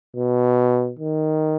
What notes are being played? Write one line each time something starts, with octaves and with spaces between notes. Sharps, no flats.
B2
D#3